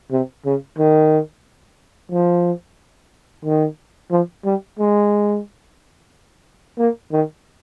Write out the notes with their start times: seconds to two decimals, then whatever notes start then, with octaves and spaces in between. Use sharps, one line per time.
0.11 C3
0.45 C#3
0.78 D#3
2.12 F3
3.45 D#3
4.11 F3
4.45 G3
4.79 G#3
6.78 A#3
7.12 D#3